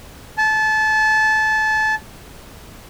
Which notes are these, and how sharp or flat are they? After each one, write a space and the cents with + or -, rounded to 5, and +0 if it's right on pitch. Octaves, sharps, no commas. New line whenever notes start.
A5 -25